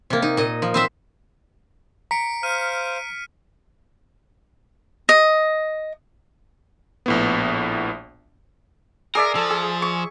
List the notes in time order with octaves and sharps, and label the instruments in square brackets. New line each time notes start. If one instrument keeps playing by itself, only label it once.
[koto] C3 A#3
D#4
A#2 D#5
F3
C4 C5 E5
[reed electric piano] A#5 [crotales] B6 C#7 D7
[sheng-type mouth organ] C5 F5 [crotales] F6 D#7
[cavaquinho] D#5
[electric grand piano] A#1 A2 B3
[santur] G#4 D5 E5 [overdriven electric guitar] A#4
[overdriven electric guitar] F3 [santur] A4
[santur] G#4
C#6